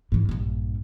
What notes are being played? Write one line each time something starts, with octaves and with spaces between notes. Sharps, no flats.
G#2 E3
A#1 G2